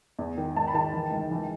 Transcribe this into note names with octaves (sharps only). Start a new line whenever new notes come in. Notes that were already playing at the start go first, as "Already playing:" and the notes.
E2
D#3
G#2 A5
B5
D#3 A5
E3
C#2
E3